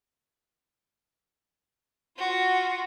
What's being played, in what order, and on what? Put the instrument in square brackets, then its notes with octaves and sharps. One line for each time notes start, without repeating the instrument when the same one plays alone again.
[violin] F4 F#4